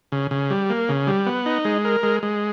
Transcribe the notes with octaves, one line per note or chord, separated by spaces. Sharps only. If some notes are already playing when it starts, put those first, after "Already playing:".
C#3
C#3
G3
A#3
C#3
G3
B3
D#4
G#3
A#4
G#3
G#3